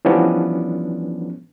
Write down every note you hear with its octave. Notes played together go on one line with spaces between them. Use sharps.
E3 F3 G3 B3 C#4 D4